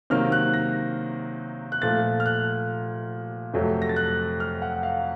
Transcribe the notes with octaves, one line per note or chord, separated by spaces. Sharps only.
C3 D#3 F#3 A#3 F6
F#6
A#6
F#6
A#2 F3 A3 A6
F6
F#6
F2 C3 F#3 A3
A#6
A6
F#6
F6
F#5
F5